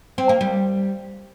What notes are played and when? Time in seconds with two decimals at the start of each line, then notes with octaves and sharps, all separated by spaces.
0.18 C4
0.29 A#3
0.41 G3